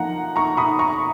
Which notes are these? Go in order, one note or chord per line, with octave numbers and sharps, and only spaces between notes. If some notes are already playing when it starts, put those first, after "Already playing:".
Already playing: F3 A#3 D#4 F5 F#5 A#5
A#5 C#6
B5 D#6
A#5 C#6